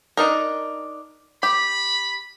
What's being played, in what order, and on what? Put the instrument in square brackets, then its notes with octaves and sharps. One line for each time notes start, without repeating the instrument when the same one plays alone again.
[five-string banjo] D4 D#4 A#4
[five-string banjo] G4 [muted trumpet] B5